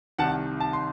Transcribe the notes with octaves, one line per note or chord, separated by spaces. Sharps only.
C2 C3 D#3 F#5 A5
A5
C6